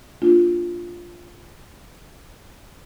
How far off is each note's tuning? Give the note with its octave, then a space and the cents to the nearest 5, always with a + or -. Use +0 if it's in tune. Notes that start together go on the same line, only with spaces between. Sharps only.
A#3 +0 D4 +0 F4 +0